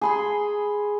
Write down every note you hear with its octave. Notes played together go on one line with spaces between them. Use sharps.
G#4 B5 C6